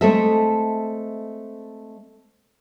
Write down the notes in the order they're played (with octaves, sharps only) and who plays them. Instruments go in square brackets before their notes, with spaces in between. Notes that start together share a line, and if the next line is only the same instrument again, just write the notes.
[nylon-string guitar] G#3 A3 C4 A4 D#5 E5